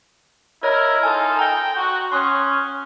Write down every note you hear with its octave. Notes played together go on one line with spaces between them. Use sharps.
E4 A#4 C#5 D#5 G#6
D#4 F4 A4 G#5
G5 A#5 A#6
F#4
C#4 C6 D#6 F#6